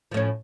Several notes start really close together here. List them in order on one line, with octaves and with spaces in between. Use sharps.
F3 A2 C#4